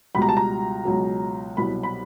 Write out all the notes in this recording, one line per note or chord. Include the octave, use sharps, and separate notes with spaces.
C#2 B2 G3 B5
A#5
A5
A#5
C#2 B2 F#3
C2 B2 F#3 B5
B5